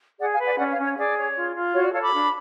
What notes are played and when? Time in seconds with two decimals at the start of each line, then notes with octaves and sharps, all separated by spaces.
0.19 G#4 D5 F#5
0.32 F5 G#5
0.39 B4
0.45 D5 F#5
0.58 C#4 D5 F#5
0.70 C#5 F5
0.77 C#4
0.84 C#5
0.96 G#4 D5
1.16 C#5
1.35 F4
1.54 F4
1.73 F#4 C#5
1.83 D5
1.92 A4 C#5 F5
2.02 B5 D6
2.12 D4